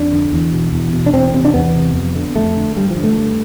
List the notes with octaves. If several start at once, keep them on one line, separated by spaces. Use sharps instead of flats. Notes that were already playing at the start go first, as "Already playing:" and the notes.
Already playing: F2 D4
D3
E2
B2
E2
B2
D4
E2 C4
C3 C4
D4
E2 B3
C3
F2
D3
F2 A3
D3
G2 G3
F3
D3
A3
G2